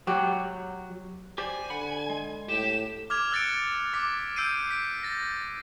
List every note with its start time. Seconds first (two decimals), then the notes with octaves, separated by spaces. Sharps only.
0.07 F#3 F#4 G4
1.38 G4 C5 D5 G#5
1.70 D3 F#5 B5
2.10 G#3
2.49 A2 G4 E7
3.10 D6 F6 G#6 F7
3.32 E6 F#6 A6 C#7 D7
3.93 D6 B6
4.36 E6 G6 C7 D7 D#7
4.71 B6 D7
5.03 A6 A#6